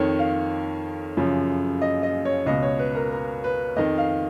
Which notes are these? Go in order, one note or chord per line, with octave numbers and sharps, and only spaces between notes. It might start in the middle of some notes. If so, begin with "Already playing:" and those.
Already playing: F2 D#3 C#5
F5
F#2 C#3 F3
D#5
D#5
C#5
C#2 B2 D#5
C#5
B4
A#4
A#4
B4
F2 D#3 D#5
F5